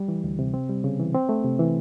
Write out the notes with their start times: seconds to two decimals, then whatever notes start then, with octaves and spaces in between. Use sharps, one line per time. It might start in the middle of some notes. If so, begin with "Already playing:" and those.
Already playing: G3
0.08 E3
0.24 D2
0.39 C3
0.54 C4
0.69 G3
0.84 C#3
0.99 E3
1.14 C4
1.29 A3
1.44 C3
1.59 E3